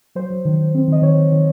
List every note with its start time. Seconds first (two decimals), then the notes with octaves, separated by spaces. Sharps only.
0.15 F#3 C5
0.30 F#3
0.45 D#3
0.59 D#3
0.74 C4
0.88 D#3 D#5
1.02 D#3 C#5
1.17 D#3
1.32 D#3